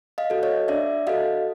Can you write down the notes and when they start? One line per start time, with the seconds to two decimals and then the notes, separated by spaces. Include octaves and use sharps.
0.18 D#5 F5
0.30 F#4 A4
0.43 C#5 D#5
0.68 D4 D5 E5
1.07 F#4 A4 D#5 F5